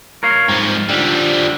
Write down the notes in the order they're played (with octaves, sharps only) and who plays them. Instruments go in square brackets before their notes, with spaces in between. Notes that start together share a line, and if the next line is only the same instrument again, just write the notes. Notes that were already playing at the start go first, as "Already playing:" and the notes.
[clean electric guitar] A#4 C#5 F5
[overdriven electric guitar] C2 F3 [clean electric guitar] G#2
[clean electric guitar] D3 [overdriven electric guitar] F3 G3